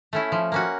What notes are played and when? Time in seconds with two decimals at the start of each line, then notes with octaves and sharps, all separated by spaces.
0.13 A3 C#4 E4
0.32 F3
0.52 A#3 C#4 F#4